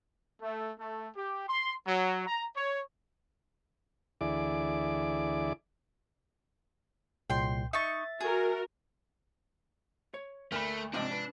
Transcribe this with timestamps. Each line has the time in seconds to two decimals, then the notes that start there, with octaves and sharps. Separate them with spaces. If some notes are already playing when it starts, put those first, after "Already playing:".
0.42 A3
0.79 A3
1.15 G4
1.49 C6
1.87 F#3
2.27 A#5
2.56 C#5
4.21 D2 E3 E4 G#4 D5 D6
7.30 C2 A#2 G5 C6
7.73 D#4 E5 C#6 A6
8.20 F#4 G#4 A#4
10.14 C#5
10.52 D2 A3 A#3 A#4 B5
10.94 G#2 C3 F3 C4 D4 D5 D#5
11.11 B4